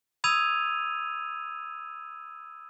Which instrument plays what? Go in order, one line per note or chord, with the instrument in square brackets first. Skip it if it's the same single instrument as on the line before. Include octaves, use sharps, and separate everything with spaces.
[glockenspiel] B5 D#6 E6 G#6 D#7 F7